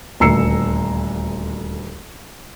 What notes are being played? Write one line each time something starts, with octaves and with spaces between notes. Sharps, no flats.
D#1 D2 A#5 E6 C7 C#7